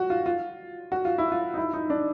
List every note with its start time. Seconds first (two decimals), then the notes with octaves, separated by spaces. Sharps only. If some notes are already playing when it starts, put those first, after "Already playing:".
Already playing: F#4
0.10 F4
0.26 F4
0.92 F#4
1.05 F4
1.18 E4
1.32 F4
1.54 D#4
1.58 E4
1.74 D#4
1.90 D4